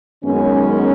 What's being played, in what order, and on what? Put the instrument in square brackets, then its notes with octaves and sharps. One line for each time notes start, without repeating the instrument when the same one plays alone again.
[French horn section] F#2 D#3 G#3 B3 C#4